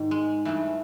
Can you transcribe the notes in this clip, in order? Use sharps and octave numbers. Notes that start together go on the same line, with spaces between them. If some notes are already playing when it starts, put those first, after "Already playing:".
Already playing: G#2 D#3
G#3
G2 E3 A3